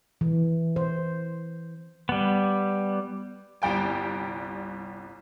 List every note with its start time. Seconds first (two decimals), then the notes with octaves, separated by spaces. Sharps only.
0.21 E3
0.76 C5
2.09 G3 B3
3.62 G1 C2 G3 G5 G#5